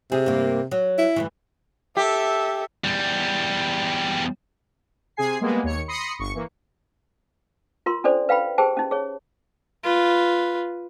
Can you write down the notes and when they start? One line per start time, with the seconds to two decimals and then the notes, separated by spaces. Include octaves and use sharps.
0.12 C3 G#4
0.26 G2 A#3
0.71 F#3
0.98 E4
1.16 D2 G2 E3
1.97 G4 A4 E5
2.84 E2 G3
5.16 C3 G#4 G#5 C7
5.41 G3 G#3 A#3 B3 G#4 B4
5.63 D#2 C#5 C#7
5.88 B5 C6 D#6 A#6 C7 C#7
6.19 G1 C#6 C#7
6.34 E3 A#3
7.86 F4 A#4 C6
8.04 C#4 D4 A4 C5 D5
8.29 B4 F5 G5 B5
8.58 G4 G#4 A#4 C5 G5 A5
8.77 C#4 D#4
8.91 G#4 C#5
9.84 F4 B4